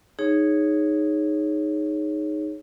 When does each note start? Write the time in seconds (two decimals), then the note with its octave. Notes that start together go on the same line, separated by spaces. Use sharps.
0.19 D#4 G#4 C#5